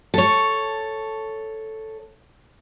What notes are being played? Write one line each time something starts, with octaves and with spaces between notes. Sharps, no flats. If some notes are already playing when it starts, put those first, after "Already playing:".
A4 C#5